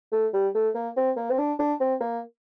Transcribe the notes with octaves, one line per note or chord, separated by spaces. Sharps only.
A3
G3
A3
A#3
C4
A#3
C4
D4
D4
C4
A#3